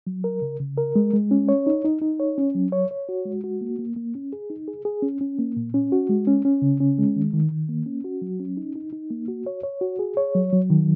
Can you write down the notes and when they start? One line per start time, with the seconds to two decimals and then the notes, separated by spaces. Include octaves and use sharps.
0.07 F#3
0.24 A#4
0.42 C#3
0.60 C#3
0.77 A#4
0.96 G#3
1.14 G#3
1.31 C#4
1.49 C#5
1.67 D#4
1.84 D#4
2.01 D#4
2.20 C#5
2.38 C#4
2.55 F#3
2.72 C#5
2.91 C#5
3.09 F#4
3.26 G#3
3.44 F#4
3.61 A#3
3.79 A#3
3.96 A#3
4.15 C#4
4.33 G#4
4.50 D#4
4.68 G#4
4.85 G#4
5.02 C#4
5.21 C#4
5.39 A#3
5.56 A#2
5.74 C#4
5.92 F#4
6.09 G#3
6.27 C#4
6.45 C#4
6.62 C#3
6.80 C#4
6.98 G#3
7.16 D#3
7.33 D#3
7.52 D#3
7.69 A#3
7.86 C#4
8.04 F#4
8.22 F#3
8.40 C#4
8.57 D#4
8.76 D#4
8.93 D#4
9.11 A#3
9.28 F#4
9.46 C#5
9.63 C#5
9.81 F#4
9.99 G#4
10.17 C#5
10.35 F#3
10.53 F#3
10.70 D#3